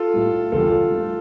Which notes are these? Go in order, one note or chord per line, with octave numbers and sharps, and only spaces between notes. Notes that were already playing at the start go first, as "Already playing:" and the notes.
Already playing: F4 A4
A2 G3
E2 D3 G3 F4 A4
G2 F3 A3